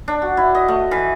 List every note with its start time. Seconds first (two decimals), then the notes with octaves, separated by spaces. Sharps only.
0.08 D4
0.22 F#4
0.37 E4
0.55 D#5
0.68 A3
0.91 E3